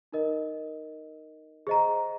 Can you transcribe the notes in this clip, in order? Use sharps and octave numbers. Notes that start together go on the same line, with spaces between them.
D#4 A#4 D#5
G#4 C5 D#5 A#5